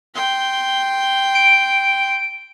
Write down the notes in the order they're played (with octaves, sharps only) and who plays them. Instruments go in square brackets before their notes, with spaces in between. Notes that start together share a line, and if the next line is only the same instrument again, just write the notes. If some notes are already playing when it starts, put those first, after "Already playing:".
[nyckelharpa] G5 C6
[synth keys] D7